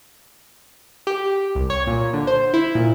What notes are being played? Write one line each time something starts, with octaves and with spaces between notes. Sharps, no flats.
G4
C2
C#5
A#2
D3
C5
E4
A#2